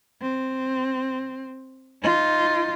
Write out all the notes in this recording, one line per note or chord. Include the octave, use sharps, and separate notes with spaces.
C4
D#4 F4